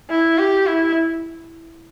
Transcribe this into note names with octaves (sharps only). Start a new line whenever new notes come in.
E4
G4
E4